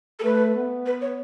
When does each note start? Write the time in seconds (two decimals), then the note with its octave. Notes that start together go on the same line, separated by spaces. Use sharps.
0.19 A4
0.23 A3 B4
0.54 B3
0.86 B4
1.01 C#5